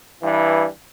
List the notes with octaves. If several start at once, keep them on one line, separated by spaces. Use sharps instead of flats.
G2 E3